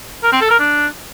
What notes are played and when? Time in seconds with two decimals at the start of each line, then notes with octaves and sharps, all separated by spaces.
0.23 A#4
0.32 C4
0.41 A4
0.50 A#4
0.59 D4